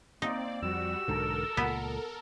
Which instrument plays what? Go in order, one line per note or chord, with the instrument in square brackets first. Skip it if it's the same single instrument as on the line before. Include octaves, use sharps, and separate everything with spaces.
[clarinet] A#3 [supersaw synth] C4 D5 [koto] D#4
[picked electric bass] F2 [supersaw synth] G3 F#4 [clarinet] E6
[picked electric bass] B1 G#2 D3 [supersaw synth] A4 A#4
[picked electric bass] C#2 A#2 [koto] B3